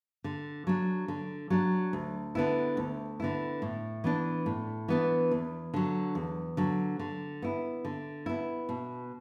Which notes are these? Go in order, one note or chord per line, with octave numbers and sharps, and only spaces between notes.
D3
F#3 D4
D3
F#3 D4
D2
D3 B3 E4
D2
D3 B3 E4
A2
E3 B3 D4
A2
E3 B3 D4
E2
D3 F#3
E2
D3 F#3
D3
B3 E4
D3
B3 E4
B2